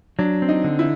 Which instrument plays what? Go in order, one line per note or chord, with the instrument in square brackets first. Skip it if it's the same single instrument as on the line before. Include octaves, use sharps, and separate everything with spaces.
[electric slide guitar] F#3 [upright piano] D4
[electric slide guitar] C4
[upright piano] D#4
[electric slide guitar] D3
[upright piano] E4